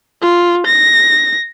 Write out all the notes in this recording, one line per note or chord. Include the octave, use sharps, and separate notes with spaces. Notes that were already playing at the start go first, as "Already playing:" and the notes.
F4
A#6